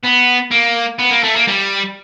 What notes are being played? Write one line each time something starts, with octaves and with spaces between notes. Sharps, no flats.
B3
A#3
B3
A#3
A3
A#3
G3